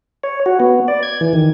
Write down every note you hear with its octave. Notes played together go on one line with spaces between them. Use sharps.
C#5
F#4
B3
D5
G#6
E3
D#3